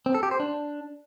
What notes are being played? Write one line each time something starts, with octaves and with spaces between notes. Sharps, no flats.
C4
A4
G4
C5
D4